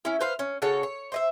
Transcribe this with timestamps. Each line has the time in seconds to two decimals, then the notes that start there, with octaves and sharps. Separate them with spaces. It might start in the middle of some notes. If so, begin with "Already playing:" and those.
0.05 C#4 E4
0.20 B4 C5 F5
0.39 C#4
0.62 C#3 F#4 A4 C#5
0.83 C#5
1.12 C5 D#5 E5